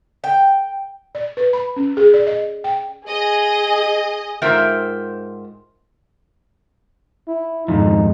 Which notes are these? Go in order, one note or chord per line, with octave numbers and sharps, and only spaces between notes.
G5
D5
B4
B5
C#4
G#4
D5
D#5
G5
G#4 D#5
G#2 F4 A#4 C5 E5 G5
E4
F2 G#2 D#4